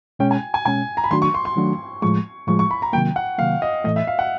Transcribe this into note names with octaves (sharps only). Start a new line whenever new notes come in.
B2 G#3 C#4 G5
G#5
G#5
B2 G#3 C#4 G#5
A#5
B5
D#3 F#3 A3 D4 F#4 C6
C#6
C6
C6
D#3 F#3 A3 D4 F#4
A2 F3 G#3 C#6
A2 F3 G#3 C#6
C#6
B5
A#5
C3 D#3 F#3 A#3 G5
F#5
C3 D#3 F#3 A#3 F5
D#5
A2 E3 A3 D#5
E5
F5
F#5